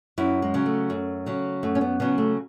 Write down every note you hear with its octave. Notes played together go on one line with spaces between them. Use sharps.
F#2 E4
G#3
C#3 F#3
A3
F#2
C#3 F#3
F#2 A3
C#4
B3
C#3 F#3 B3
A3